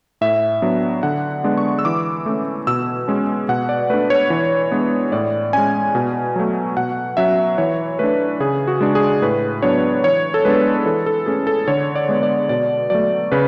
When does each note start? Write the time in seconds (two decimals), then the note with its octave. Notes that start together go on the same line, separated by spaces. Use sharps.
0.21 A2 E5
0.62 F#3 B3 D4
1.03 D3 F#5
1.44 G#3 B3 D4
1.57 C#6
1.79 E6
1.85 E3 D6
2.26 A3 C#4
2.67 B2 E6
3.08 G#3 C#4
3.49 B2 F#5
3.69 D5
3.90 A3 D4 B4
4.10 C#5
4.30 E3
4.72 G#3 B3 D4
5.12 A2 D5
5.53 G#3 C#4 G#5
5.95 B2
6.36 F#3 A3
6.77 B2 F#5
7.17 F#3 C#4 E5
7.58 E3 C#5
7.99 A3 D4 B4
8.40 C#3 G#4
8.68 F#4
8.81 G#3 D4
8.95 G#4
9.22 A2 B4
9.62 F#3 B3 D4 C#5
10.04 E3 C#5
10.34 A4
10.45 G#3 B3 D4 B4
10.86 E3 A4
11.06 A4
11.26 A3 C#4 G#4
11.47 A4
11.68 D3 C#5
11.95 D5
12.09 G#3 B3
12.23 D5
12.49 B2 D5
12.90 F#3 A3 D5
13.32 C#3 B4